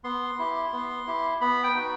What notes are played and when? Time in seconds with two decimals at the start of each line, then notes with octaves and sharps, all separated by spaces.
0.04 B3 C6
0.39 E4 G4
0.72 B3
1.07 E4 G4
1.41 B3 B5
1.64 G5
1.75 D#4 F#4